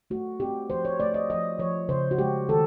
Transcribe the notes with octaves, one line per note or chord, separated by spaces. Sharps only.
A3 F#4
C4 G4
F3 C5
C#5
A3 D5
D#5
F3 D#5
F3 C#5
C#3 C5
F#4
G#3 G4
D#3 A4